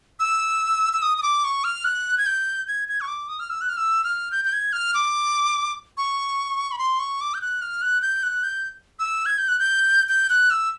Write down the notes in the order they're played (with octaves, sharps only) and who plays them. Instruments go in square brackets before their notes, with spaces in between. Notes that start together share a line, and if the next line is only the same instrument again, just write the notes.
[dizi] E6
E6
D#6
D#6
D6
C#6
F6
F#6
G#6
G6
G#6
G#6
C#6
D6
D#6
F6
E6
F#6
F6
E6
F6
G6
G6
G#6
F6
D6
C#6
B5
C6
C#6
D6
G6
F#6
F6
F#6
G6
F#6
G6
E6
G#6
G6
F#6
G6
G6
F#6
E6